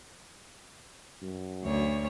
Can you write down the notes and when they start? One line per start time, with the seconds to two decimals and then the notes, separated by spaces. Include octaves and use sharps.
1.22 F#2
1.64 D2 C#5